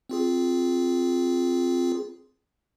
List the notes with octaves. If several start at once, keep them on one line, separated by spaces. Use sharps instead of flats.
C4 F4 G#4